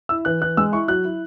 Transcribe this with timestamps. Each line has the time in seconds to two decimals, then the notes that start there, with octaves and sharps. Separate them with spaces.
0.09 E4 E6
0.25 E3 F#6
0.41 E3 F#6
0.57 G#3 E6
0.72 E4 C#6
0.88 F#3 F#6
1.05 E4